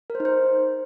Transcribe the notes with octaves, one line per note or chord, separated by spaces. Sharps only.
A#4
C5
D#4
C5